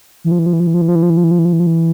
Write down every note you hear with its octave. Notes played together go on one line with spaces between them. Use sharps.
E3
F3
E3
F3
E3
F3
E3
F3
E3
F3
E3
F3
E3
F3
E3
F3
E3
F3
E3
F3
E3